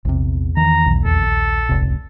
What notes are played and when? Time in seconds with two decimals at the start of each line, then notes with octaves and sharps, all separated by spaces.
0.05 A#1 E2 C3
0.57 D#3 E3 A#5
0.86 B1
1.05 A#1 D#2 A4
1.69 F1 C#2 C3